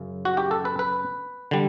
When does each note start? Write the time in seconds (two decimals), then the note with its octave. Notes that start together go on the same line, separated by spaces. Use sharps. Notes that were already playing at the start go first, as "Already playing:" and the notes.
Already playing: F#2 C#3
0.25 F#4
0.37 G4
0.51 A4
0.65 B4
0.79 B4
1.51 D3 G3